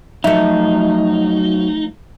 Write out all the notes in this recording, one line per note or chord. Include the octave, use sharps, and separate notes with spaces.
F3 F#3 A3 D#4 E5